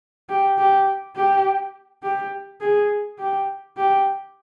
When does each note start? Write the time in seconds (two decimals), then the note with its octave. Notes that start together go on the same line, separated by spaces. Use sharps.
0.29 G4
0.58 G4
1.16 G4
2.03 G4
2.61 G#4
3.19 G4
3.77 G4